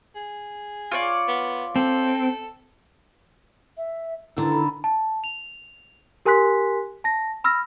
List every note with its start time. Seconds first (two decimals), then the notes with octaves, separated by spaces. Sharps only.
0.15 G#4
0.91 F4 C#5 D5
1.28 B3
1.76 C4 A4
3.77 E5
4.37 D3 D#3 E4 A4 A#5 E6
4.52 B5
4.84 A5
5.24 F7
6.25 G4 A#4 G#5 C6 F#6 B6
7.04 A5 A#6
7.44 B5 E6 F6 A#6